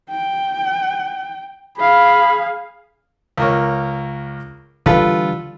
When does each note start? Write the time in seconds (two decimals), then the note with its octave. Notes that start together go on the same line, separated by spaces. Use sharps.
0.10 G5
1.78 G#4 F5 B5
3.37 C#2 A#4 C#5
4.86 D3 E3 G3 F4 A4 B4